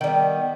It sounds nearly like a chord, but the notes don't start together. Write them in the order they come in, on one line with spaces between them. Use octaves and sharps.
D#3 G3 B3